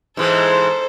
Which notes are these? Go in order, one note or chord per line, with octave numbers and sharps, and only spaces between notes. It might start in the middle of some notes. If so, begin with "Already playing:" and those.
G#2 E3 G#3 A4 C5